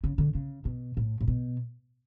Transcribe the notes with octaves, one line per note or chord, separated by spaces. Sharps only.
C#3
D3
C#3
B2
A2
A2
B2